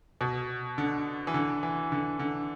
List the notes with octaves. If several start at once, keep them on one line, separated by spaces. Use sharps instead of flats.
B2
D3
E3
D3
E3
D3
D3